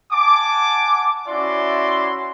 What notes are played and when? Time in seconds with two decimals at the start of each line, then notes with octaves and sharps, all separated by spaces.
0.12 F#5 G#5 A5 D6
1.28 C#4 E4 F#4 D5 E5 C6